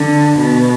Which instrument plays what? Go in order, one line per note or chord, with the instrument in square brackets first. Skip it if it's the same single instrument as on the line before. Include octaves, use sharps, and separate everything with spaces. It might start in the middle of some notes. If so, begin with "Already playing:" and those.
Already playing: [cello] D3
B2